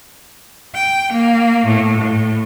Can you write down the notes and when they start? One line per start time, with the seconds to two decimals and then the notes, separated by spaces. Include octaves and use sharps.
0.75 G5
1.10 A#3
1.66 A2
1.99 A2